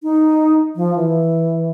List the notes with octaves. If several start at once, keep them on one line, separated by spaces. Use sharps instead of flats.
D#4
F3
E3